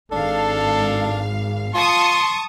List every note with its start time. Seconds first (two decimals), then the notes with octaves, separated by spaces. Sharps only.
0.12 G#1 D4 A4 F5
1.74 F4 A5 C6 C#6 D#6